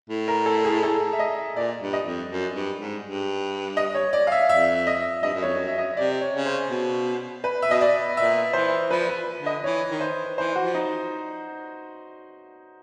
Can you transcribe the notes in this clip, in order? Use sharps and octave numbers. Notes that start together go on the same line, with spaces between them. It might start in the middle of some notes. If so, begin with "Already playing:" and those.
A2
A#4
A4
G#4
A4
E5
D#5
A#2 D5
G2
D#5
F2
F#2
G2
G#2
G2
D#5
C#5
D5
F5
E5
F2 E5
D#5
G2 D#5
F#2
F2 C#5
F#2
E5
D#5
C3 D5
C#5
C#3
C5
B2
B4
E5
B2 D#5
D5
A#2 E5
E3 C5
F3 B4
B4
D3
D#5
E3 C#5
D#3
C5
E3 C5
F#4
F3
D#4